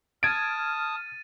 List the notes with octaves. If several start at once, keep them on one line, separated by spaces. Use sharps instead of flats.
A5 D#6 F6 G#6 A6 D7 D#7